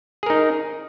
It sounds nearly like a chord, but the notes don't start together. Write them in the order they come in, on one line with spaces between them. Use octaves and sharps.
G#4 A#4 D#4